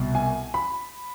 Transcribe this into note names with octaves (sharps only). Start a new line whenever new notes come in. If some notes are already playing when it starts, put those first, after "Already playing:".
Already playing: C2 B2
G#5
B5